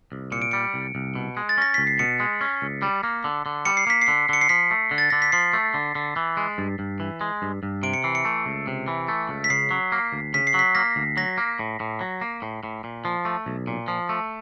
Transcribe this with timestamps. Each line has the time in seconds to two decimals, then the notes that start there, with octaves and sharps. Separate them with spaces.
0.12 C2
0.32 A#2 C#7
0.42 D7
0.51 G3 C#7
0.74 C2
0.95 C2
1.15 B2
1.37 G#3
1.49 A6
1.58 C#4 A#6
1.74 C#2 B6
1.87 C7
1.99 B2 C#7
2.20 G#3
2.41 C#4
2.62 C#2
2.82 G3
3.03 A#3
3.24 D3
3.46 D3
3.65 G3 C#7
3.77 C7
3.87 A#3 B6
4.02 C7
4.08 D3
4.29 D3 C#7
4.41 C7
4.49 F3 B6
4.71 A3
4.91 D3
4.98 A6
5.10 D3 A#6
5.22 B6
5.32 F3 C7
5.53 A3
5.74 D3
5.95 D3
6.16 E3
6.37 G#3
6.58 G2
6.79 G2
7.00 E3
7.21 G#3
7.42 G2
7.63 G2
7.83 C3 D7
7.94 C#7
8.04 E3 C7
8.15 C#7
8.25 A3
8.46 C#2
8.67 C3
8.88 E3
9.08 A3
9.29 C#2
9.44 B6
9.50 C#3 C7
9.71 F#3
9.92 A#3
10.12 D2
10.34 C#3 B6
10.47 C7
10.54 F#3 B6
10.75 A#3 A#6
10.96 D2
11.17 F#3 A#6
11.38 A#3
11.59 A2
11.80 A2
12.01 F#3
12.21 A#3
12.42 A2
12.63 A2
12.84 A#2
13.05 F3
13.25 A3
13.46 B1
13.67 A#2
13.88 F3
14.09 A3